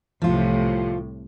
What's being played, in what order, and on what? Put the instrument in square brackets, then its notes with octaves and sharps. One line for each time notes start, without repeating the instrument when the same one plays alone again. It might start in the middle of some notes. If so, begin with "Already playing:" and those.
[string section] C2 A2 C3 [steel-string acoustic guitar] F3 F4